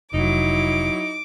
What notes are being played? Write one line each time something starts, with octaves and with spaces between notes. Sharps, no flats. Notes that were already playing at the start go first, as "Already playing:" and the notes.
F1 F#3 D#4 E4 D6